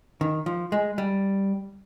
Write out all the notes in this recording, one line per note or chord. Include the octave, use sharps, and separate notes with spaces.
D#3
F3
G#3
G3